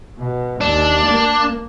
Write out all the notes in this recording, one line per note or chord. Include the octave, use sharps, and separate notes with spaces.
B2
D#2 D4
A#3